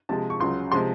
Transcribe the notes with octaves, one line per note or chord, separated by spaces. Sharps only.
C3 F3 G#3 A5
C#6
C#2 C#3 F#3 C6
C3 F3 G#3 C6